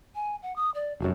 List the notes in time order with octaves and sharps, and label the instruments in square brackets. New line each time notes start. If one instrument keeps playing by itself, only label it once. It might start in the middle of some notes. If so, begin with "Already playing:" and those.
[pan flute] G#5
F#5
D#6
D5
[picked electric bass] F1 F#2 [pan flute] F#4